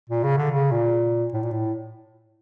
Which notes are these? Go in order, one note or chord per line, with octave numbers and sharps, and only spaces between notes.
A#2
C#3
D3
C#3
A#2
A2
A#2
A2